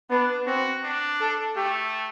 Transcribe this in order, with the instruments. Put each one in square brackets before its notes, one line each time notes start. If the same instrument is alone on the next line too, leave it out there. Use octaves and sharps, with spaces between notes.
[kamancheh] B3 [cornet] D4
[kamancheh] C4 [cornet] F#4
[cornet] D4
[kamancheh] A4
[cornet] A3 [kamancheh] G4